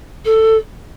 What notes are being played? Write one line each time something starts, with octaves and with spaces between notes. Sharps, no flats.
A4